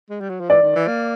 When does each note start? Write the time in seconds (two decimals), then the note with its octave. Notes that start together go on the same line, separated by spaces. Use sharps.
0.10 G#3
0.21 G3
0.29 F#3
0.40 F3
0.49 E3 D5
0.62 D#3
0.76 E3
0.88 A#3